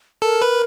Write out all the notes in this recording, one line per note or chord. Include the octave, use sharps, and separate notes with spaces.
A4 A#4
B4